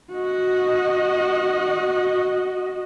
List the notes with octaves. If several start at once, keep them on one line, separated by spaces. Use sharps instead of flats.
F#4 D#5